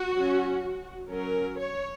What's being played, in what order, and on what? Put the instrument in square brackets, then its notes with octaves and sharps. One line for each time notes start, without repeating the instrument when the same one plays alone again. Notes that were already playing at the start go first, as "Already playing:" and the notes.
Already playing: [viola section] F#4
F#3 C#4
F#3 C#4 A#4
C#5